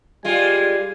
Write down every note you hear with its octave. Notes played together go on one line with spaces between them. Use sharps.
G3 G#3 F4 G#5